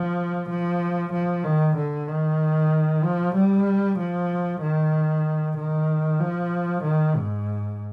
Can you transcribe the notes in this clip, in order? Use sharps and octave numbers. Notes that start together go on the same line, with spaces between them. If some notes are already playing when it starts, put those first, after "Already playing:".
Already playing: F3
F3
F3
D#3
D3
D#3
F3
G3
F3
D#3
D#3
F3
D#3
G#2